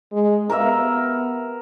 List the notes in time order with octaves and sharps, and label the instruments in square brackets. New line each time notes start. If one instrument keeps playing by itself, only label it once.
[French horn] G#3
[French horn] B3 [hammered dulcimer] A#4 E5